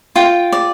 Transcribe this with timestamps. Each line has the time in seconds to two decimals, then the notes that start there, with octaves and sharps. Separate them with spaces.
0.16 F4 G5
0.52 D5